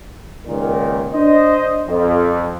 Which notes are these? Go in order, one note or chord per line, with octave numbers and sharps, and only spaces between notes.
C#2 A#2 D#3
D4 C5 D#5
F2